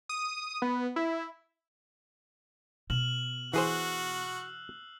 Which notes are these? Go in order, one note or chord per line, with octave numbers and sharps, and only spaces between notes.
D#6
B3
E4
B2 F6 E7 F#7
E3 F#4 G#4 C5 E6 F#6 C7